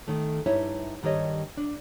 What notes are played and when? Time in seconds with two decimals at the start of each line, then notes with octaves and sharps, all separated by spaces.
0.08 D#3 A3
0.46 G2 D#4 E4 C#5 E5
1.03 G2 D#3 G3 C#5 D#5
1.57 D4